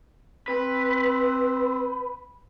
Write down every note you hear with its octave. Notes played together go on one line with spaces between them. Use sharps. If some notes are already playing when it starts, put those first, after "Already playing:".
C4 B4